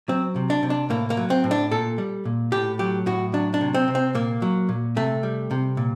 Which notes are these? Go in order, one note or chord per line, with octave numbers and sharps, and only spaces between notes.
F#3 C4
C3
D4
C3
D4
A2 A#3
A#3
F#3
C4
A2
D4
A#2 A4
G3
A#2
A2 G4
F#3 G4
A2 F#4
F#3 D4
D4
C3
C4
C3
C4
A#2 A#3
F#3
A#2
C3 A3
G3
C3
A#2